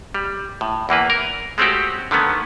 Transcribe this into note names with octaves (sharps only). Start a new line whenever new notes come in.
G3
A2
E2 E3 A#3 B4
A#4
G#3 A3 C4 C#4 F#4 G4
D3 D#3 A3 B3 C#4